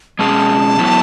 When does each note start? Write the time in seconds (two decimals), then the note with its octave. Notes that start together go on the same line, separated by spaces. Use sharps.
0.19 B2 G#3 C#4 G#4 A5
0.79 F#3 B3 E4